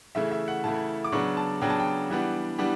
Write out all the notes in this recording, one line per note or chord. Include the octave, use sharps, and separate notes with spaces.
C#3 E3 A3 E4 E5
E5
F#5
C#3 E3 A3 E4 A5
D6
C#3 F#3 B3 D4 C#6
A5
C#3 F#3 B3 D4 G5
A5
G5
E3 G3 B3 D4
E3 G3 B3 D4